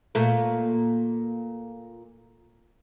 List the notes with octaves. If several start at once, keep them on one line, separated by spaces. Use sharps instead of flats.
A#2 A3